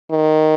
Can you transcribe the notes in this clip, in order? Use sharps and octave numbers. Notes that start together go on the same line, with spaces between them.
D#3